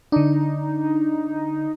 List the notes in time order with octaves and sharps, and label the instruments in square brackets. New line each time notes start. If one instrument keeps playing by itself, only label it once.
[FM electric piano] D3 D4 [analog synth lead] D#4